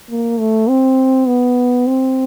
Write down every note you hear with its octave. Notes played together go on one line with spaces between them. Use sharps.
A#3
A3
C4
B3
C4